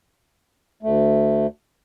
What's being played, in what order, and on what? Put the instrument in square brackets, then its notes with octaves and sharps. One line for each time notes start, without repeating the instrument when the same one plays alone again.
[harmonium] D2 A3